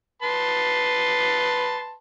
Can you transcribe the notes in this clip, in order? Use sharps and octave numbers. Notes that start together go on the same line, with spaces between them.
B4 A5 C6